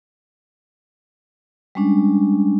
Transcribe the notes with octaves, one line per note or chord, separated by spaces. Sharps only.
G3 G#3 C#4 D4